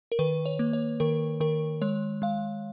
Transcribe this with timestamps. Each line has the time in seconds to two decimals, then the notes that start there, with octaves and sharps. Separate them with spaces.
0.12 A#4
0.19 D#3 B4
0.46 C#5
0.59 A#3
0.73 C#5
1.00 D#3 A#4
1.40 D#3 A#4
1.82 G#3 C#5
2.22 G#3 F5